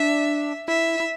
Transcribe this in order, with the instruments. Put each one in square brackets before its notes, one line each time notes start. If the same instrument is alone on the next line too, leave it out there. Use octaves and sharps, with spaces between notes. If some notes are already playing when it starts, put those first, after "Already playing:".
Already playing: [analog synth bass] D4 [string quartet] E5
[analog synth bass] E4 [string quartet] E5
[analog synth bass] E4